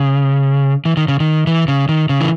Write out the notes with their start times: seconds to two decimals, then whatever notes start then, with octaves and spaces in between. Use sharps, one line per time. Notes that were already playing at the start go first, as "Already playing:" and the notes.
Already playing: C#3
0.85 E3
0.97 D#3
1.08 C#3
1.20 D#3
1.47 E3
1.68 C#3
1.89 D#3
2.09 C#3
2.21 E3